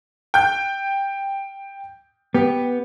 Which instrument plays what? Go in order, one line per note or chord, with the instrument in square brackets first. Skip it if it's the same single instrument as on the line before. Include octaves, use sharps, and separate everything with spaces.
[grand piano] G5 G6
[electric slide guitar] B3 [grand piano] G4